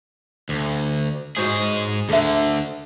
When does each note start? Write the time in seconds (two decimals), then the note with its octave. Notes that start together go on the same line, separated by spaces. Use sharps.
0.49 D2
1.36 G#2 F#4 G#4 C5 C#5
2.09 D2 D3 A4 A#4 E5